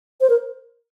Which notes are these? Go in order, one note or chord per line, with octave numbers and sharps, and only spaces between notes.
C5
A#4